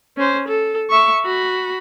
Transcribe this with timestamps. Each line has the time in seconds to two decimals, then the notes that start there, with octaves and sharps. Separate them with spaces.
0.17 C#4 C5
0.48 A4
0.90 E5 C#6
1.25 F#4 B5